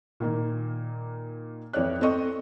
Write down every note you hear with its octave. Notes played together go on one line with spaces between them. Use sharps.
A#2 D#3 A#3
F2 E3 C#5 D5 F#6
C4 A4 D#5 C#6